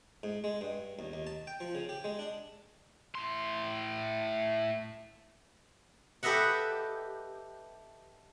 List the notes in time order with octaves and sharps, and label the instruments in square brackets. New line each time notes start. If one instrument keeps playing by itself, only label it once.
[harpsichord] G#2
G#3
G2
D#2
D#2
A5
G5
F3
C#3
G4
G#3
D4
[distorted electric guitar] A2 C6
[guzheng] G4 A4 B4 D#5 E5 F#5